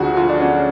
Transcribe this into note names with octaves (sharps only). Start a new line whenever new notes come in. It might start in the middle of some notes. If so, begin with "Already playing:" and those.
Already playing: D2 D3 F3 F#4 G#4
F4
D4
C#4